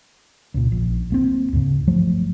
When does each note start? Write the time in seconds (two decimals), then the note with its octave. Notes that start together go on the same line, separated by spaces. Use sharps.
0.54 C#2 A#2
0.72 A#1
1.10 D1 A#3 C4
1.53 D2 G#2 C#3
1.87 G1 F3 F#3 A3